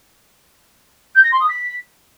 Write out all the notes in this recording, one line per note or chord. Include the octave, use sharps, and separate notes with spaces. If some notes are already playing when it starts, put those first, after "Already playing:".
G6
A#6
C6
D#6
B6